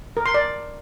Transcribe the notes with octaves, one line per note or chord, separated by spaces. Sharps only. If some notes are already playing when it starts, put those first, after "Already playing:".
A#4
C6
D5